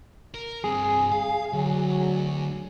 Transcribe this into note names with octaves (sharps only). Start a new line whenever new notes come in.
A#4
G2 C4 G#4
F5
D2 F#3